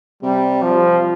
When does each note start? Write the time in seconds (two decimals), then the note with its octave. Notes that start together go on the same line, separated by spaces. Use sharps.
0.22 C3 G3
0.63 F3